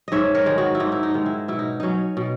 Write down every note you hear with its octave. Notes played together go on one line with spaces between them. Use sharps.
G#2 C#5 D#5 E5
A#4 C#5
D#3 G#3
D#4 F#4
E4
G#2 D#4
E4
D#4
D#3 G#3
E4
B2 E4
D#4
F#3 C#4 D#4
B2